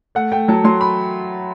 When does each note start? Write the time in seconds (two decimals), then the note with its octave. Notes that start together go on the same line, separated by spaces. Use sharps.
0.15 A3 F#5
0.32 A3 G5
0.48 F#3 A5
0.64 F#3 C6
0.81 B5